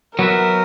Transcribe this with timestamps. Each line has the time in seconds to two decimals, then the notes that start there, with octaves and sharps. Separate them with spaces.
0.19 F#3 B3 F#4 A#4 B4 E5